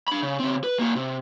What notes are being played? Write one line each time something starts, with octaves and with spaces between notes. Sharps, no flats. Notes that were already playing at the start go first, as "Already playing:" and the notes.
D4 B5
C#3
C#3 C4
B4
A#3 F#4
C3